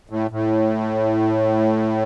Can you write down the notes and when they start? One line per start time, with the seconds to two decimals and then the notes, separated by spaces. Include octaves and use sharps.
0.10 A2
0.31 A2